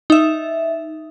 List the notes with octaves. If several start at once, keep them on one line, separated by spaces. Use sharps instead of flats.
D#4 E5